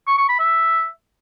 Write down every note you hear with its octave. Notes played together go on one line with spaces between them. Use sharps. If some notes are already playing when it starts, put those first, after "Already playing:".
C#6
C#6
B5
E5